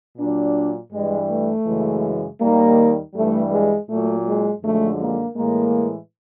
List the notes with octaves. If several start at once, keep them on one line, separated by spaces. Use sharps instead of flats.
A#2 F#3 D4
G2 E3 G3 G#3
A3
F#2 C#3 E3 G#3
D#2 D#3 G3 A#3
G2 E3 G3 A3
G#3
A#2 F#3 A3
G#3
F#2 D3 F3 G#3 A3
A#3
A2 E3 G#3 A#3